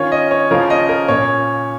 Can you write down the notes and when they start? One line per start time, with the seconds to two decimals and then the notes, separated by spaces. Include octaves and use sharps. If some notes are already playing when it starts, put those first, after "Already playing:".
Already playing: D#3 C#4 F4 C#5
0.12 D#5
0.31 C#5
0.50 C#3 F3 A#3 C#4 F4 A#4
0.70 D#5
0.89 A#4
1.08 A#2 A#3 C#4 C#5